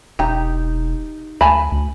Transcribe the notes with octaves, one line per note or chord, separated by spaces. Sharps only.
E1 D#4 G4
D2 G#5 A5 B5
D2